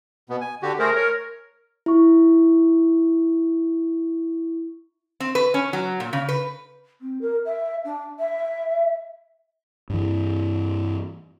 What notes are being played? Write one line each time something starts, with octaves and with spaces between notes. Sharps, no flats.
B2 B3
G#5
D3 F#4 G4
A3 G#4 A#4 C5
C#5
E4 C#6
C4
B4
C#4
F#3
A#2
C#3
B4
C4
A#4
E5
D4
E5
G2 E3